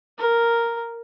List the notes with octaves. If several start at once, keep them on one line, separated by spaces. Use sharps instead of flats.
A#4